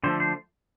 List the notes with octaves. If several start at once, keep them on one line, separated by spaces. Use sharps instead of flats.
D3 F3 A3 C5
C5